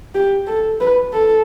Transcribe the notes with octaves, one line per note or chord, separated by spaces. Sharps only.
G4
A4
B4
A4